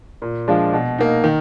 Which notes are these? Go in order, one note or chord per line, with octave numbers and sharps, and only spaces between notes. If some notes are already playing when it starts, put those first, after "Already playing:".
A#2
F3 G#3 D4 F4
B2
A#3 D#4
D#3